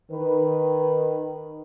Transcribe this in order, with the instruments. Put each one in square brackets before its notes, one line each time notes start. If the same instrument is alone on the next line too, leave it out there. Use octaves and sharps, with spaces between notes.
[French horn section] D#3 B4